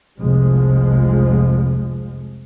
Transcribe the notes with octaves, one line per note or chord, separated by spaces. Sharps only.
F1 C2 F3 G#3